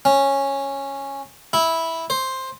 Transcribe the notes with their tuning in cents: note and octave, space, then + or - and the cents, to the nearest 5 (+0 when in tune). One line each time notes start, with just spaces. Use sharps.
C#4 -10
E4 -10
C5 +5